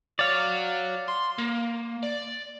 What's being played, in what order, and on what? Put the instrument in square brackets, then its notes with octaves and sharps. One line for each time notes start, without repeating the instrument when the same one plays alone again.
[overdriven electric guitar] F#4 C#5 [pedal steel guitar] D5 F5
[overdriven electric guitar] C6
A#3
D5